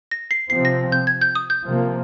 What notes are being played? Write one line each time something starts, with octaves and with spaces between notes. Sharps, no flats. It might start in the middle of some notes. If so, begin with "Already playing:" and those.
A#6
C7
C3 F3 C4 C7
A#6
G6
G#6
G6
D#6
G6
C3 F3 A#3